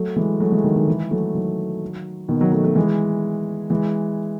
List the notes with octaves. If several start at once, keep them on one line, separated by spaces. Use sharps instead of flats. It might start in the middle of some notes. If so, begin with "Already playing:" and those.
Already playing: F#3 A3
E3 G#3
F#3 A3
E3 G#3
D#3 F#3
D#3 F#3
E3 G#3
F#3 A3
D#3 F#3
B2 D#3
D#3 F#3
F#3 A3
F#3 A3
E3 G#3
E3 G#3